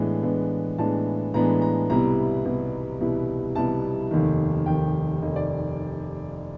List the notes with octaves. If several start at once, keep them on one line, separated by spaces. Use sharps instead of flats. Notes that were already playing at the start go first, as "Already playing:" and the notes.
Already playing: A2 E3 G#3 B3 D4
A2 E3 G#3 B3 D4
A2 E3 G#3 B3 D4 A5
A2 E3 G#3 B3 D4 A#5
A#5
C2 B2 G3 B3 E4 A#5
C2 B2 G3 B3 E4
C2 B2 G3 B3 E4
C2 B2 G3 B3 E4 A5
F1 D#2 D#3
F1 D#2 D#3 G5
F1 D#2 D#3 D#5
D5